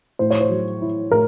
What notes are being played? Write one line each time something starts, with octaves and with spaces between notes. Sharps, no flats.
A2 C5
C#5
C5
F#3
E4
A2 A#4